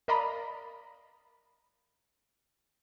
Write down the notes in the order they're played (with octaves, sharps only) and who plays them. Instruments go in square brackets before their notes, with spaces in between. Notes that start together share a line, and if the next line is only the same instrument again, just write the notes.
[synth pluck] A#4 D5 D#5 F5 A#5 B5